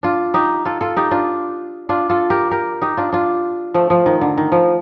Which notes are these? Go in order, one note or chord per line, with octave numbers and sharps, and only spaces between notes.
D4 F4
D#4 G4
F4 A4
F4 A4
D#4 G4
D4 F4
D4 F4
F4 A4
G4 A#4
G4 A#4
D#4 G4
D4 F4
D4 F4
F3 A3
F3
D#3
D3
D#3
F3